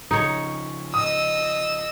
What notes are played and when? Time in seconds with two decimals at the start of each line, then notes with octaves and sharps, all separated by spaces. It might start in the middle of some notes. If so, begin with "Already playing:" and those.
0.11 C#3 F3 D#4 C#5
0.94 D#5 D#6 E6